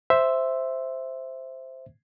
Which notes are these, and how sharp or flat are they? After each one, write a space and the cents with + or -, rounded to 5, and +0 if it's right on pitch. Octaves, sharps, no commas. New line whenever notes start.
C5 +0 E5 +0